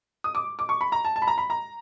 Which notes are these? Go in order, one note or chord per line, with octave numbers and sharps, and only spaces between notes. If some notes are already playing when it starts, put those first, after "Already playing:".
D#6
D6
D6
C#6
B5
A#5
A5
A5
B5
A#5
B5
A#5